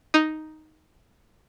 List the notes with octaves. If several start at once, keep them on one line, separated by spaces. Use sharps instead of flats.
D#4